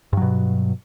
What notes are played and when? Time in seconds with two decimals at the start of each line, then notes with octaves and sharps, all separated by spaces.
0.13 G2
0.17 F#3
0.22 B2